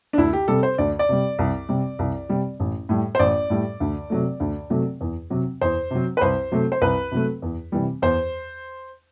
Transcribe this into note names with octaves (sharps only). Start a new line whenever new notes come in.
D4
D2 E4
G4
C3 G3 A4
C5
D2 D5
D5
C3 G3
C2
C3 G3
C2
C3 G3
A1
A2 G3
C5
A1 D5
A2 G3
D2
C3 F#3 A3
D2
C3 F#3 A3
E2
C3 F#3
E2 C5
C3 F#3
B4
C2 C5
C3 F#3 A3
C5
C2 B4
C3 F#3 A3
E2
C3 E3 G3
E2 C5